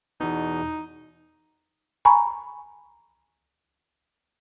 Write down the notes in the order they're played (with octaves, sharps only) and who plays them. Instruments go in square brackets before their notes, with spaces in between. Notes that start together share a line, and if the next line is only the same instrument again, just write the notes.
[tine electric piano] E2 B2 [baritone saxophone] D#4
[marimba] G#5 A#5 B5 C#6